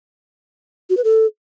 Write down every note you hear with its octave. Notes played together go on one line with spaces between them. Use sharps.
F#4
B4
A4